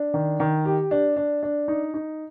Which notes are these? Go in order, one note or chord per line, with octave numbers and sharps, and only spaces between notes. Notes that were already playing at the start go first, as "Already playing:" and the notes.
Already playing: D4
D#3
D#3
G4
D4
D4
D4
D#4
D#4